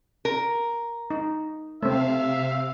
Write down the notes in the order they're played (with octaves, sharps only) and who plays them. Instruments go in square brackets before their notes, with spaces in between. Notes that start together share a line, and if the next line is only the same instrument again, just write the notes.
[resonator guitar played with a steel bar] A#4
[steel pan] D#4
[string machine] C3 F5 [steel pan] A3 C4 [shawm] E5